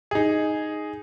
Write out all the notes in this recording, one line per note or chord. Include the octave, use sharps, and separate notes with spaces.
D#4 G#4